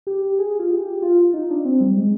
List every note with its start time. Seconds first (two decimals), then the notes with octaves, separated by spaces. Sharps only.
0.07 G4
0.39 G#4
0.59 F4
0.71 G4
1.02 F4
1.34 D#4
1.50 D4
1.65 C4
1.81 G3
1.97 G#3